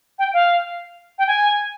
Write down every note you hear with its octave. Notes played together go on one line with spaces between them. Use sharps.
G5
F5
G5
G#5